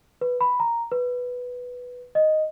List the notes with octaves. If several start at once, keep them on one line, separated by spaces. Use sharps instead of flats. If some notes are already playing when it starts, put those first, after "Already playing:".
B4
B5
A#5
B4
D#5